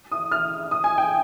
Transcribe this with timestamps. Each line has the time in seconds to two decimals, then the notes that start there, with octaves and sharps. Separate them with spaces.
0.11 D#6
0.31 F6
0.71 D#6
0.84 G#5
0.98 G5